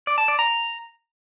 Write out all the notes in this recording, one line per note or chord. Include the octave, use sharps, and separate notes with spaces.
D5
A5
D5
A#5